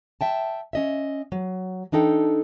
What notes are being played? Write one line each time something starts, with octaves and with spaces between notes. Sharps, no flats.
E5 G5 A5
C#4 D#5 E5
F#3
E3 D4 D#4 A4 G5